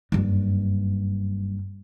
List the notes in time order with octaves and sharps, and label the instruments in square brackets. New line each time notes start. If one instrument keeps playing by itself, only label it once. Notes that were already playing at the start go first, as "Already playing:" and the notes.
[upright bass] F#1 G2